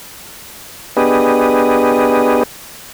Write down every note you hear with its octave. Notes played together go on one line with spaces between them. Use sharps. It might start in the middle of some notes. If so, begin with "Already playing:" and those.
B3 D4 G4 G#4 B4 D#5